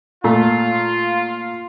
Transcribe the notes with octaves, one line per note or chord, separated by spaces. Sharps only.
A#2 A3 F4